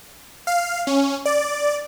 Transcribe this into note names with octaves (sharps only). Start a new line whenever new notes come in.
F5
C#4
D5